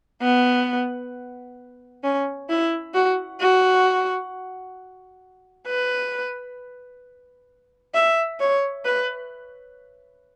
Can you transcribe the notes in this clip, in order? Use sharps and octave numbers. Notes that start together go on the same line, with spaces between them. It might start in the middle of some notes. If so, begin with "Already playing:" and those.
B3
C#4
E4
F#4
F#4
B4
E5
C#5
B4